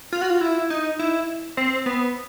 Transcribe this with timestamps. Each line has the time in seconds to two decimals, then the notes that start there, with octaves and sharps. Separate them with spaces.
0.12 F4
0.21 F#4
0.30 F4
0.41 E4
0.70 D#4
0.99 E4
1.57 C4
1.86 B3